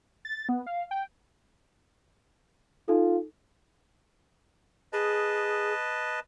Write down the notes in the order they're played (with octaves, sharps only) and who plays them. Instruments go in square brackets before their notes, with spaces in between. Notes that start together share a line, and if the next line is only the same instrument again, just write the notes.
[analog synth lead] A6
B3
F5
G5
[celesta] D#4 A4 [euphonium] F4
[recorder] G#4 [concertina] B4 D#5 A5